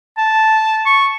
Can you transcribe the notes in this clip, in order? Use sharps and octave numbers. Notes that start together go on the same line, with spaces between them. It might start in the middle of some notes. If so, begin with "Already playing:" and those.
A5
C#6